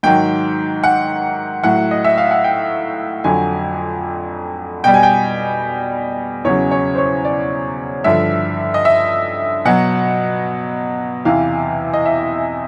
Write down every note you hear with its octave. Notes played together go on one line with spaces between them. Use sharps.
G#2 D#3 F#3 G5
F#5
A2 F#3 F#5
D#5
E5
F5
F#5
G5
F2 D3 F#3 G#5
B2 G3 G5
G#5
G5
E2 C#3 F#3 C#5
C#5
C5
C#5
D5
G2 D3 F3 E5
D#5
E5
B2 F#3 F#5
E2 C3 E3 F5
D#5
E5